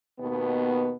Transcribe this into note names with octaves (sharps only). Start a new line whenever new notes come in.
D#2 B2 B3